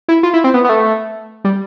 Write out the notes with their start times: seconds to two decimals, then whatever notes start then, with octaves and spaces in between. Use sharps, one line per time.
0.09 E4
0.23 F4
0.34 E4
0.44 C4
0.54 B3
0.64 B3
0.69 A3
1.44 G3